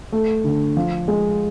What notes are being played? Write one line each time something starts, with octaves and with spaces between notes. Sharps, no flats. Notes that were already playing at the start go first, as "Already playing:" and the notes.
A3
D3
F3
G#3